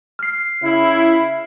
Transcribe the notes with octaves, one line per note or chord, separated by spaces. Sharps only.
F6 C7
C#3 E4